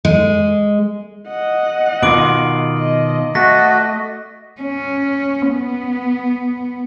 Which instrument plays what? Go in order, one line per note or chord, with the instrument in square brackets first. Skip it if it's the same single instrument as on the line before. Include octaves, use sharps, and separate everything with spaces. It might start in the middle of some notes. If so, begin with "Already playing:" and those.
[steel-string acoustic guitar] G#3
[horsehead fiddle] D#5 F#5
[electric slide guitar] B2 D#3 F4 [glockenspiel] D6 D7 F#7
[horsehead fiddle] D#5
[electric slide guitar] A3 [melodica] F#4 [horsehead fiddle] D#5 [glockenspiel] A#6
[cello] C#4
B3